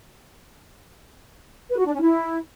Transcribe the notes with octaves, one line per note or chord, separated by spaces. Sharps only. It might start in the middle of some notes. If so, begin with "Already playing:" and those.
B4
F#4
D4
C#4
E4